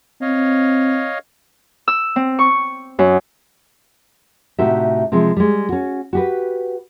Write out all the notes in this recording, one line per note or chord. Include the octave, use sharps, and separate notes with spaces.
C4 C#5 D#5 F5
E6
C4
C#6
F#2
A2 C3 D#4 F#4 G4 E5
C3 F3 G#3 C4
G3 G#3
C#4 F#4
F#4 G4 B4